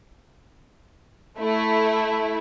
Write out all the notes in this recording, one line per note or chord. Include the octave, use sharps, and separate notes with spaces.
A3 E4